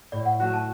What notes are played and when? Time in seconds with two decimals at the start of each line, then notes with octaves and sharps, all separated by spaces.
0.12 A2 D5
0.25 F#5
0.40 A3 F#4 F#5
0.53 A5